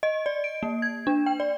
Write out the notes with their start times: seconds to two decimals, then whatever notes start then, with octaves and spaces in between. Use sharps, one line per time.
0.03 D#5
0.26 D5
0.44 D7
0.63 A#3
0.82 G#6
1.07 D4
1.26 G5
1.40 D5